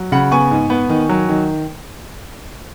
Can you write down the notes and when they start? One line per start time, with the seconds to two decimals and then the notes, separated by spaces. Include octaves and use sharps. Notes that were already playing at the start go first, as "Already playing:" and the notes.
Already playing: F#3
0.12 C#3 F#5 B5
0.31 B3 G#5 C#6
0.51 G#2
0.70 B3
0.90 D#3
1.09 F#3
1.29 D#3